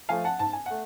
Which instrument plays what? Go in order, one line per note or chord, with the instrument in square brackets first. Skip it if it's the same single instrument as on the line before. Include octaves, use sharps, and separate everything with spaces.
[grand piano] F3 A3 F5 G#5
F#5 A5
G#2 A5
G#5
A3 F#5